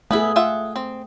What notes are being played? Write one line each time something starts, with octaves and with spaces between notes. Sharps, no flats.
A3 B3 E4 G#4 E5
F4 E5 F#5
C4